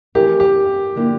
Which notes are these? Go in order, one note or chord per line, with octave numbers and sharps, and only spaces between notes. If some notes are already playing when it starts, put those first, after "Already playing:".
F2 E3 A3 E4 G4 A#4
G4
D3 F3 A#3 E4 G4